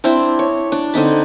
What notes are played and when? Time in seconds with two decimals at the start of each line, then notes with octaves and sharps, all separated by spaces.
0.04 C4 D4 E4 C5
0.39 C#5
0.72 D4
0.94 D3 C4 D#4 B5